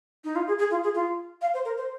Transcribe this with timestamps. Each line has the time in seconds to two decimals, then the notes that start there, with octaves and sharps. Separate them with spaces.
0.24 D#4
0.36 F4
0.48 G#4
0.59 G#4
0.71 F4
0.84 G#4
0.95 F4
1.42 F5
1.54 C5
1.65 A#4
1.77 C5